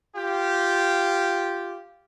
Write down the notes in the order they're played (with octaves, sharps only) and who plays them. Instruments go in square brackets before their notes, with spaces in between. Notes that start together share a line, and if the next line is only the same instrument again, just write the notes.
[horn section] F4 G4